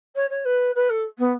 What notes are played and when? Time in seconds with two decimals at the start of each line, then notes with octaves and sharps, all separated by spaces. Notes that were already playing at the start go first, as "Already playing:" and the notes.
0.15 C#5
0.30 C#5
0.45 B4
0.75 B4
0.89 A4
1.18 B3